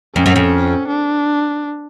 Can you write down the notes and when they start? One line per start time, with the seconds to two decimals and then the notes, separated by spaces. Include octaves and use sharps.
0.15 F2 C#4
0.26 F#2
0.36 F2
0.88 D4